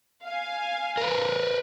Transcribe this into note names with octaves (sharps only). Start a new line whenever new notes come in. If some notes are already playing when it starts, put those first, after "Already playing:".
F5 G#5
A#4 B4